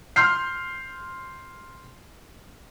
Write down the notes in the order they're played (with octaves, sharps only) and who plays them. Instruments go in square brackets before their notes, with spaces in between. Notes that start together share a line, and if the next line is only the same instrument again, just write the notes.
[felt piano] C6 F6 G6 C7